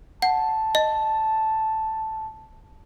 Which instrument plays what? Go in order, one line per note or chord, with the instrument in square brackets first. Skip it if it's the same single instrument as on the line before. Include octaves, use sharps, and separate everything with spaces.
[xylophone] F#5 [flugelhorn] A5
[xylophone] D#5